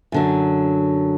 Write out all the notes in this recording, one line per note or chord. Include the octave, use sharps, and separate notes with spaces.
F#2 D3 F#3